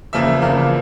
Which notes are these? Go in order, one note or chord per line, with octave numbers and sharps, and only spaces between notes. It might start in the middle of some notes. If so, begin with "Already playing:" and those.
E2 C#3 F3 A#3 E5
E2 C#3 F3 A#3 F5